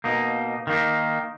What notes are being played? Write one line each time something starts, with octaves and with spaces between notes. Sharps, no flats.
B2 A#3 D#4
D#3 A#3 D#4